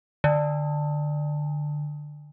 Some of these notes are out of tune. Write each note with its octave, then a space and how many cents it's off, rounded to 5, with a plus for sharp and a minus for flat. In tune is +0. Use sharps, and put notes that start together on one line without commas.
D3 +15